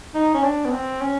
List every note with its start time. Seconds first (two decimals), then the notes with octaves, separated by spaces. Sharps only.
0.15 D#4
0.34 C#4
0.44 D4
0.65 B3
0.72 C4
1.01 C#4